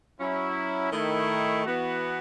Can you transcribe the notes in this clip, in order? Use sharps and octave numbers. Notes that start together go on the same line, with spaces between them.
F#3 C#4 E4
D#3 A3 E4
E3 B3 F#4